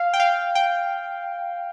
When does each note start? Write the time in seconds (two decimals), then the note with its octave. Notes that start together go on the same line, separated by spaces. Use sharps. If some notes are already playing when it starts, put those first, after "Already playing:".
Already playing: F5
0.14 G5
0.20 F5
0.55 G5